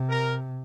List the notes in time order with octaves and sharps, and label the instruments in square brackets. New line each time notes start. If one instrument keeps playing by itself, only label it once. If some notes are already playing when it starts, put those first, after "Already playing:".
Already playing: [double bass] C3
[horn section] A#4